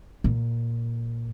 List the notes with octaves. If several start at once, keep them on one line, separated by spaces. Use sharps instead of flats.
A#2